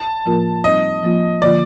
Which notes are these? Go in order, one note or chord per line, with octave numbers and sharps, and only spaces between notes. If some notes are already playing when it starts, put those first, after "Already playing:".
Already playing: A5
A2 F3 A#3 F4 A#4
G3 C4 D#4 D#5
F3 A#3 F4
D3 F3 A#3 F4 D5